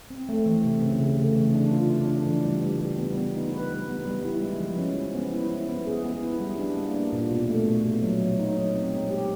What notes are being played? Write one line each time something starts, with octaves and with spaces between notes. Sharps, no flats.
C4
A3
E3
C3
C#3
C#3
A3
E3
D4
F4
D4
D4
E3
G3
G3
G3
B3
B3
D#4
B4
G3
B3
G3
E4
G#3
F3
C#4
G#3
B3
E4
E4
B3
G#4
B3
E4
G3
D4
A#3
D4
A#2
B2
A3
B2
B2
F#3
F#3
D#4
F#3
C4
G#3
G4